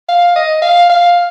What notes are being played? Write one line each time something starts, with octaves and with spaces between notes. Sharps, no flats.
F5
D#5
F5
F5